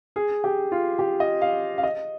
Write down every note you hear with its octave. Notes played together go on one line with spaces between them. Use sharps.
G#4
G4
F4
G4
D#5
F5
F5
D#5